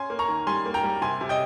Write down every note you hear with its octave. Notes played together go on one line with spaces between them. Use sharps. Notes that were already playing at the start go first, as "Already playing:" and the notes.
Already playing: C#4 G#5 C6
A#3
A#5 C#6
D#3
G3 G#5 C6
A#3
G5 A#5
G3
C3 G#5 C6
C3
D#5 G5